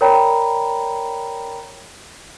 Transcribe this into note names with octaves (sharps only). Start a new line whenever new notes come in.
A#4 C#5 D5 G5 A#5 B5